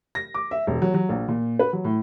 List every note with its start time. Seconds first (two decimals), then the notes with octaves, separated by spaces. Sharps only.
0.15 A#6
0.34 D6
0.51 E5
0.67 E1
0.82 F#3
0.94 F#3
1.09 A#1
1.28 A#2
1.59 B4
1.73 F#3
1.84 A2